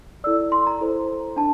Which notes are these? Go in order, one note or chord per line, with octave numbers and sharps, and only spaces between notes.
E4 A4 D5 E6
C6
A#5
E4 A4 C5
D4 A5